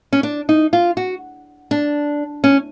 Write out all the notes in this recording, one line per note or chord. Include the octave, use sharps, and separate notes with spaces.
C#4
D4
D#4
F4
F#4
D4
C#4